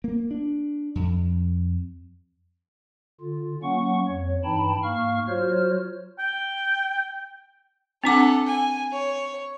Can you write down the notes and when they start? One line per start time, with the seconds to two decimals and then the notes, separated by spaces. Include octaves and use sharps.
0.04 A#3
0.31 D4
0.95 F2
3.21 D3 F4
3.63 F#3 A#3 C#4 F#5 C#6
4.08 F2 C#5
4.44 G2 E3 D#4 G5 A5 B5
4.83 G#2 A#3 F5 C#6 F6
5.28 F#3 F4 F#4 C5 C#5 F6
6.19 G5
8.04 C4 D4 A4 F#5 D6
8.47 G#5
8.93 C#5